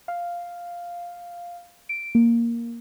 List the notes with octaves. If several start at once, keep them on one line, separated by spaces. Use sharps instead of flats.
F5
D7
A#3